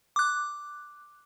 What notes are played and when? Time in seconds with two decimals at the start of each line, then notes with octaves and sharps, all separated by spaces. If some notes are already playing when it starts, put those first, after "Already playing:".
0.16 D6 F#6